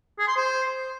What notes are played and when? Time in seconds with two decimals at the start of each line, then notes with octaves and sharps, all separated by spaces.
0.19 G#4
0.28 C6
0.36 C5